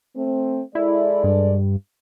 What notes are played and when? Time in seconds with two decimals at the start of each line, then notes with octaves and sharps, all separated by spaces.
0.16 A3 C4
0.75 G#3 E4 A4 D5
1.24 G2